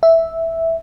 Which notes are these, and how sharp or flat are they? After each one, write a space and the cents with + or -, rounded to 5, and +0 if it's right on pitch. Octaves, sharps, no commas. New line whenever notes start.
E5 -5